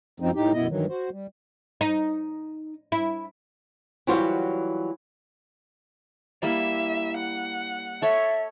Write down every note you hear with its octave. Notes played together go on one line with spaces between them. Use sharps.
F#2 F3 C4 D#4
A2 D#4 G4
F#2 B2 B3 E4 D#5
G2 D#3 E3 F#3
F#4 C5
G3
D#4
E4
E3 F#3 G3 F4 F#4 C5
G3 A#3 E4 E5
F#5
A4 C#5 E5